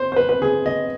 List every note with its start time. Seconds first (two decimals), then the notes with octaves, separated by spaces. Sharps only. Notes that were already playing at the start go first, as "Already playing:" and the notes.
Already playing: C5
0.12 C5
0.16 B4
0.29 B4
0.42 G#4
0.66 D#5